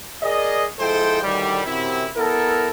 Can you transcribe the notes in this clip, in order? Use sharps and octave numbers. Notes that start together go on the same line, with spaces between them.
G#4 A#4 D5 D#5
F3 G#3 E4 A4 C5 G5
D2 A2 D#3 G3
F#2 C3 E4
B3 E4 A4 A#4